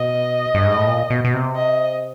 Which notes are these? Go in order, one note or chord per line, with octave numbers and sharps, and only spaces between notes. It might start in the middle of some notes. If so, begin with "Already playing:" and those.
Already playing: B2 D#5
G2
G#2
A2
A#2
B2
B2
C3
D#5